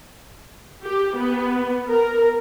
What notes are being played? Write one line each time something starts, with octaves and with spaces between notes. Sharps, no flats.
G4
B3
A#4